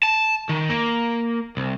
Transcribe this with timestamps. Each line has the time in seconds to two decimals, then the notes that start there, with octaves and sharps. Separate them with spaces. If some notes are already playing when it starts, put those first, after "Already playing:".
0.03 A5
0.49 D#3
0.70 A#3
1.57 C2